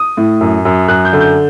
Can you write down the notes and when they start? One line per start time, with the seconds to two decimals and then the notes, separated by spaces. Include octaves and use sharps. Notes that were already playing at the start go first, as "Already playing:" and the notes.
Already playing: D#6
0.17 A2
0.41 F#2
0.65 F#2
0.88 F#2 F#6
1.05 G6
1.13 D3
1.20 G6